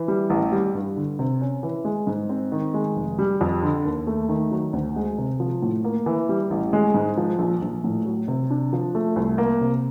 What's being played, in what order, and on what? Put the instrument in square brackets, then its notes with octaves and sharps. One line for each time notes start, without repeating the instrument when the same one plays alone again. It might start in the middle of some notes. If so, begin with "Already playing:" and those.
Already playing: [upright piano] E3
G3
A1
G3
G2
D3
C3
C#4
E3
G#3
G#2
C4
D#3
G#3
F1
G3
F2
D3
D#2
A3
D#3
F#3
D2
G#3
C3
F3
A2
A#3
E3
G3
A1
G#3
G#2
F3
A#1
A#1
A2
F#3
C3
D4
F3
A3
C2
A#3
C3